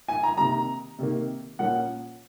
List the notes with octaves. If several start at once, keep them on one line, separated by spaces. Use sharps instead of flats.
G#5
A#5
C3 D#3 A#3 A#5
C3 D#3 A#3
A#2 F3 A#3 C#4 F#5